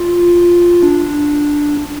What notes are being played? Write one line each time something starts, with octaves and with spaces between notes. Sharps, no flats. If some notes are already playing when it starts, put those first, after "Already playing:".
Already playing: F4
D4